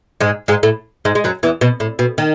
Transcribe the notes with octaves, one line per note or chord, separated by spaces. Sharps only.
G#2 G#3
G#2 G#3
A2 A3
G#2 G#3
G#3
F#2 F#3
E2 E3
B2
A2
B2
D#3